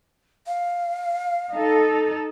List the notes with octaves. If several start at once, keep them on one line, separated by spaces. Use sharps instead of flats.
F5
D#4 A4